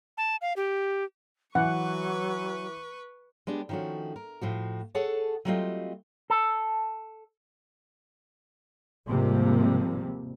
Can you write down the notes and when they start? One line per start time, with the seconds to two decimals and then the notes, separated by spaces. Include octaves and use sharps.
0.17 A5
0.41 F5
0.56 G4
1.55 E3 F#3 B4 F#5 C#6
3.47 G#3 B3 D4 G4
3.69 D#3 F3 A3 C#4 F#4
4.16 A#4
4.41 A2 F3 F#4
4.95 G#4 A4 C#5 F#5 A5
5.45 F#3 G3 A3 C4 F4 D#5
6.30 A4
9.09 D#2 G#2 C3 F3 G3 A#3